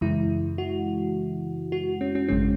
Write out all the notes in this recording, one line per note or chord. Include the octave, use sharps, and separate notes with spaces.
F#2 C#3 E3 G#3 E4
F#4
F#4
C#4
C#4
G#1 F#2 C#3 G#3 C#4